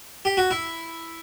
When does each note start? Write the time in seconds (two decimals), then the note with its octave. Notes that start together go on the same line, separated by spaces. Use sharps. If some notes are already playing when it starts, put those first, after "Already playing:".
0.25 G4
0.37 F#4
0.51 E4